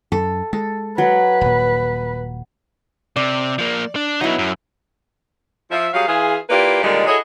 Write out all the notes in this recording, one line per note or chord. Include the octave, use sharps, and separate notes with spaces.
F#2 A4
G#3 A4
F#3 B4
D#1 A#2
C3 D5
F3 A#3
D4
F#3 B3 D#4 E4
F#2
F3 E5
F#3 G3 G#4 F5
E3 F4 G#4
A#3 E4 F4 G4 B4 D5
A#2 D3 D#3 G3 G#3
E4 F#4 G#4 A4 C#5 D#5